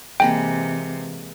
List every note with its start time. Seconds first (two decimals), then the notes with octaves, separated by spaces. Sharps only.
0.20 C3 E3 G#3 A#3 B4 G5